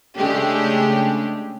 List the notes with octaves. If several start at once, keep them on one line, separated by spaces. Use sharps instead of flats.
C#3 G#3 A3 D4 G4 G#4